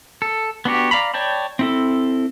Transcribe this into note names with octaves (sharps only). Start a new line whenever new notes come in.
A4
B3 D4 F#4 G4
D5 F5 A#5 B5
C#5 D5 G5 A5 B5
C4 E4 A4